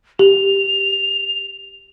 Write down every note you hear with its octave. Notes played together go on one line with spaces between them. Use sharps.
G4 F7